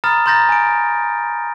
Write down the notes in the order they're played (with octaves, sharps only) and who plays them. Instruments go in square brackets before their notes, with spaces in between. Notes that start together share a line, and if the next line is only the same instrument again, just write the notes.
[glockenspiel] A#5 B5 D#6 F6 A6
A#5 C6 G6 A6 A#6
G#5 D7